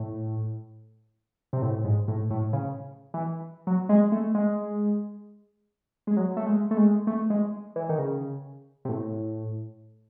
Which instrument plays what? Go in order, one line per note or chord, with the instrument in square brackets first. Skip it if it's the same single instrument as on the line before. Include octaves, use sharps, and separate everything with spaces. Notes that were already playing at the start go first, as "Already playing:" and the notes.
Already playing: [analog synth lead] A2
C3
A2
G#2
A2
A2
C#3
E3
F#3
G#3
A3
G#3
G#3
F#3
A3
G#3
A3
G#3
A3
G#3
E3
D#3
C#3
C3
A2